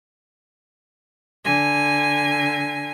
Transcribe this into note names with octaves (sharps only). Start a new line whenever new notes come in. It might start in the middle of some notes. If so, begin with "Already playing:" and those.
D3 G#5